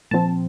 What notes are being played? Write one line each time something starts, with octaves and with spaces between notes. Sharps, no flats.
A#2 F3 C4 A5